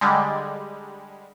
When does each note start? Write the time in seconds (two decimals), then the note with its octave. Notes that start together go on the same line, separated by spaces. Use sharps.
0.01 D3 G3 G#3